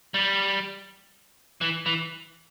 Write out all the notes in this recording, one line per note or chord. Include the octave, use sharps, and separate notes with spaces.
G3
E3
E3